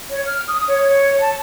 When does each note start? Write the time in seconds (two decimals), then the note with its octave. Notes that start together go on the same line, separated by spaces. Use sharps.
0.10 C#5
0.25 F6
0.47 D#6
0.66 C#5
0.80 C#5
1.19 A5